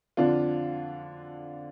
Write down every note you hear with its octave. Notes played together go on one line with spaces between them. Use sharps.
F2 D3 D4 F4